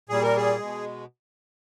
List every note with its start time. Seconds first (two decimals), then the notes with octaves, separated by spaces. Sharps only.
0.09 A#2 G3 G#4
0.23 A#4
0.36 G#4
0.58 B2 G#3